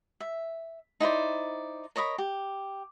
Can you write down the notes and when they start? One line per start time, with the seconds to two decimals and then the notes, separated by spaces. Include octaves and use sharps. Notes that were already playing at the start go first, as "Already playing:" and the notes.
0.20 E5
1.00 D#4 E4 C5 D5
1.96 A#4 C#5 D#5 B5
2.18 G4